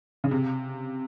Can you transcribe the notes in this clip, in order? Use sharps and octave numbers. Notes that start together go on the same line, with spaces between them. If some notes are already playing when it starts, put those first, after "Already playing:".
C#3
C3